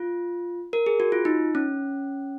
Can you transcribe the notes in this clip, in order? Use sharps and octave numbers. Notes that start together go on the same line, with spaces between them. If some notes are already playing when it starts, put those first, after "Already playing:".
Already playing: F4
A#4
G#4
F#4
F4
D#4
C#4